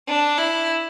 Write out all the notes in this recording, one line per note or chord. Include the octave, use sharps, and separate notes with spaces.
D4
E4